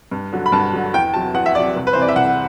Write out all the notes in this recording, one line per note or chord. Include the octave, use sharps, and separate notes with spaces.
G2
D3 F#3
B5
G2 A5
D3 F#3
E2 G5
C3 F#3 A5
E2 F#5
E5
C3 F#3 D5
C2
B4
C3 E3 C5
D5
E5
C2 F#5